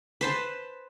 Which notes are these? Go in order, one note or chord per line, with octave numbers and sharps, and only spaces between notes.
B4 C5 A5